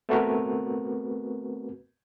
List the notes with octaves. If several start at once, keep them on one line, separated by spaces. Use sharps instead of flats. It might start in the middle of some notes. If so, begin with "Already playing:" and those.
A3 B3 C4 F#4 A#4 B4